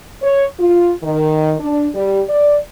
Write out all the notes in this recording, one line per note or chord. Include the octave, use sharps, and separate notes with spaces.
C#5
F4
D#3
D4
G3
D5